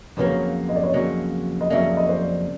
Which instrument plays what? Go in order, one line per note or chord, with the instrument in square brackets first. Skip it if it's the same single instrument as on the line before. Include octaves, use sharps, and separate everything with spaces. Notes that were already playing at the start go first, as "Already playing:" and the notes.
[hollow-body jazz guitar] F2 C#3 F#3 A#3 [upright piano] B4 C#5
[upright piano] D#5
D5
C#5 D#5
[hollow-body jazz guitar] F2 C#3 F#3 A#3
[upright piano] D#5
[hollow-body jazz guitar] F2 C#3 F#3 A#3 [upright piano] D5 E5
[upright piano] D#5
C5 D5